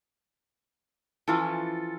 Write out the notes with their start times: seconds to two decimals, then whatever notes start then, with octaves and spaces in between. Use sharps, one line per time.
1.28 E3 F3 C#4 F4 A4